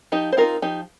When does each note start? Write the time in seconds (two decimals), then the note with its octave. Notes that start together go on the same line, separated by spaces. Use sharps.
0.12 F3 D#4 G4
0.32 C5
0.37 C4 D#4 F4 A#4
0.62 F3 D#4 G4